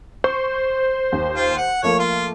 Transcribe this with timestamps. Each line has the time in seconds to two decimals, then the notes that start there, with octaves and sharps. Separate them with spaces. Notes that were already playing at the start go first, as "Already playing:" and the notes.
0.24 C5 C#6
1.12 D#2
1.35 F4
1.57 F#5
1.83 F3 A3 A#3 C#5
1.99 F4